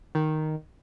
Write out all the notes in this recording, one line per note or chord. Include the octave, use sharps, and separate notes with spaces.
D#3